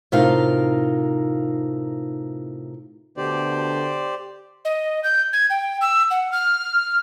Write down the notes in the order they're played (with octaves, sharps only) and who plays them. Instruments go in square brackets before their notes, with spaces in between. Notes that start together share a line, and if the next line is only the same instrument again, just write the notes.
[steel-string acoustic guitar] A2 C3 D#4 F4 A#4 F5
[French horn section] D2 B2 D3 [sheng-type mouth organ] G4 C5 D5
[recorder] D#5
G6
G#6
G5
E6
F#5
F6